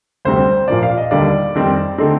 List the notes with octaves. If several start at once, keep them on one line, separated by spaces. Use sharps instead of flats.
D2 C3 G3 C4 C5
A#2 F3 A#3 D5
F5
D#5
D#2 D3 G3 A#3 D#4 D5
F2 D#3 G3 C4 D#4
D3 A3 C4 D#4